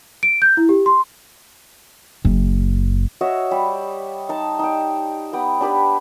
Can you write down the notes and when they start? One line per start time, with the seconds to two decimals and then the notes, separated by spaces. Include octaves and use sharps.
0.23 D7
0.42 G6
0.57 E4
0.69 G4
0.86 C6
2.25 F#1
3.21 F#4 C#5 D#5 E5
3.51 G3 G4
4.29 D#4 A5
4.59 D#4 G5
5.33 B3 G4 G5 D#6
5.61 D4 G4 B4 G5